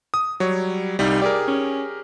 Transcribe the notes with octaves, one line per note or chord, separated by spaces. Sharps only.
D#6
F#3 G3 C#5
C2 G3 D#4
G4 G#4 A#4 D5
C#4